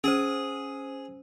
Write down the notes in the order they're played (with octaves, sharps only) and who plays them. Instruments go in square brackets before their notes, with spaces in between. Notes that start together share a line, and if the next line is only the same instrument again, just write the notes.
[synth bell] C#4 C5 [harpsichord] G#4